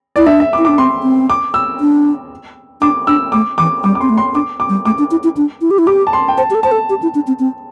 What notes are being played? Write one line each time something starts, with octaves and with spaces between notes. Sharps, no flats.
E4 D5
D4 E5
E5
D6
E4
D4 D6
C4 C6
C4
D6
E6
D4
D4 D6
D4 E6
A3 D6
E3 D6
G3 D6
D6
C4 C6
A3
C6
D4 D6
D6
G3
A3 D6
D4
E4
E4
D4
E4
G4
E4
G4 D6
A5
C6
G5
C5 A5
G4
A4
C5 A5
A4
G4
E4
D4
C4
C4